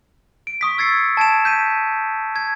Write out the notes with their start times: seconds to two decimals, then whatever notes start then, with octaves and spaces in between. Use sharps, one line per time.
0.47 D7
0.61 C#6 D#6 B6
0.78 E6 G#6 A6 C7 C#7
1.17 A5 G#6 D7 E7
1.45 G6 B6 D#7
2.36 G#6